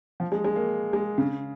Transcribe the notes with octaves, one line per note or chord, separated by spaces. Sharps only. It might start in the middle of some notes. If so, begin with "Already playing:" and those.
F3
G#3
G#3
A#3
G#3
C#3